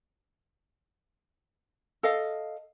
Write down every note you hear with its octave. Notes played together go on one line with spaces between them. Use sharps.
A4 D#5 F5